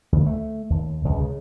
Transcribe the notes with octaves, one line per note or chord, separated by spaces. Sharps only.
D2
A3
D#2
C#2
C#3